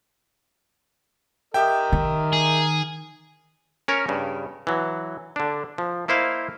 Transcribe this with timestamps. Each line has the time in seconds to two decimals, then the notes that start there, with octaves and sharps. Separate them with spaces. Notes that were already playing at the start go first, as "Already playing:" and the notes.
1.54 G4 A#4 D#5 E5 G5
1.92 D#3
2.33 G#4
3.88 C#4 A#4 C#5
4.08 G2 C#3
4.67 E3 F#3
5.36 D3 D4
5.78 F3
6.08 A#3 E4 C5 D#5 F5